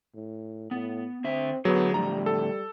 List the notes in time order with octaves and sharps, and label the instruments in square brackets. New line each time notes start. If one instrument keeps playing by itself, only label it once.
[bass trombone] A2
[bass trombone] A2 [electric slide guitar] B3
[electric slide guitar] D3 E5 [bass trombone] C4
[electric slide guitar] D3 A3 G#4 [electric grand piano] F#3 [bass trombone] B3
[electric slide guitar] A2 D3 F3 [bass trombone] G3 [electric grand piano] A#5
[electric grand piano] A4